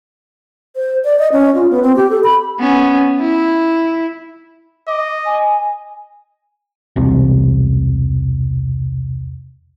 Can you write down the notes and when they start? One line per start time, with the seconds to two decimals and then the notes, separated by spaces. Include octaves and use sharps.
0.76 C5
1.05 D5
1.19 D#5
1.32 C#4
1.55 F4
1.70 B3
1.82 C4
1.96 G4
2.10 A4
2.24 B5
2.60 B3 C#4
3.21 E4
4.88 D#5 D6
5.25 G#5
6.96 E1 C2 C3